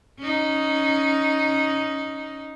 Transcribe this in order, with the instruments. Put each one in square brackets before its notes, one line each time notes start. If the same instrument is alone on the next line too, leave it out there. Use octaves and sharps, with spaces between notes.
[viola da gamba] C#4 D#4